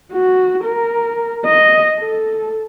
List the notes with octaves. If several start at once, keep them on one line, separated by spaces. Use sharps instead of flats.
F#4
A#4
D#5
A4